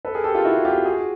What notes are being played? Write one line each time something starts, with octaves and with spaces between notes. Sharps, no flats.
A4 B4
G#4 A#4
G4 A4
F4 G4
E4 F#4
F4 G4
F#4 G#4